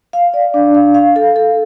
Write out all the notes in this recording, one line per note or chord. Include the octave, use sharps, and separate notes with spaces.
F5
D5
D4
F5
F5
A4
A4